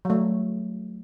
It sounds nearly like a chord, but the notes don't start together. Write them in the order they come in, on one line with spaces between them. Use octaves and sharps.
F#3 A3 G3